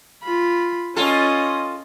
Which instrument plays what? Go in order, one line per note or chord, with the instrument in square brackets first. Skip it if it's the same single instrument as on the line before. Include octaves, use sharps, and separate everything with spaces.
[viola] F4 B5
[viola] C#4 D#5 [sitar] F4 A4